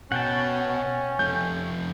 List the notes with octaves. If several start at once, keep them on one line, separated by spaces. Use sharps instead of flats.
B2 C#4 F#5 G5 A5
F2 A3 G6